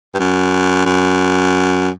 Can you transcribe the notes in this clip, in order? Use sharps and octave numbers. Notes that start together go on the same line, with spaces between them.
G2
F#2
F#2